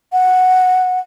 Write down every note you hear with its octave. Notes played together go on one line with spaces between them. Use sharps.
F#5